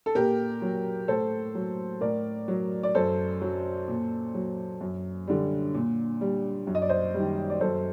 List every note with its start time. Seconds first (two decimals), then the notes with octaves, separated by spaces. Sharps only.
0.06 A4
0.15 A#2 G4 A#4
0.62 F#3
1.08 A2 A4 C5
1.55 F#3
2.01 A2 A#4 D5
2.48 F#3
2.83 D5
2.95 F#2 A4 C5
3.41 F#3
3.88 A#2
4.34 F#3
4.81 F#2
5.28 D3 G3
5.74 A#2
6.21 G3
6.67 F#2
6.75 D#5
6.82 D5
6.89 C5 D#5
7.14 D#3 G3
7.50 D5
7.61 F#2 A4 C5